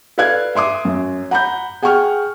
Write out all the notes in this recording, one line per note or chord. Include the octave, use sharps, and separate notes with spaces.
A4 B4 D5 F5 F#6 G#6
E5 C6 D6 D#6
F#2
F#5 A#5 B5 G6
G#4 F#5 G5 C#6 F6